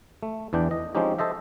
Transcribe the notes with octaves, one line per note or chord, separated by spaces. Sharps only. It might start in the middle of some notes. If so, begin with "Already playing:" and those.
A3
E2 E3 D4 G5
D#5
F3 G#3 C4 C#4 D#4 G4
A4 C5 D#5 E5